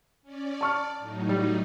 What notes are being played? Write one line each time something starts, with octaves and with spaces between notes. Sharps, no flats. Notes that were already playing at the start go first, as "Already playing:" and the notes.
C#4 D5
D5 A5 C#6 F6
A2 F#3 D#4
G3